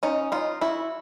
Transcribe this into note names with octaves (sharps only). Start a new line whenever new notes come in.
C#4 D#4
D#4 F4
E4 F#4